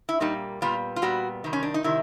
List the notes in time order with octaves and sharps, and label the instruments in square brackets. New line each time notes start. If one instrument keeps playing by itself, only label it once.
[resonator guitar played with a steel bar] E4
A#2 G3 A#3 D#4
A#2 G3 B3 F4
F4
A#2 G3 B3 F#4
C3 D#3 G3
C#4
D4
D#4
C3 D#3 G3 E4